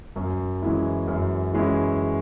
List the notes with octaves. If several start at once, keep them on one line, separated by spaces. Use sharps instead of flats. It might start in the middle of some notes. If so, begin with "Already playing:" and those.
F#2
E3 G#3 C#4 E4
F#2
E3 G#3 C#4 E4